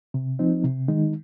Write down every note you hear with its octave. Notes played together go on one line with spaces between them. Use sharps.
C3
F3 C4 D#4
C3
D#3 G#3 D#4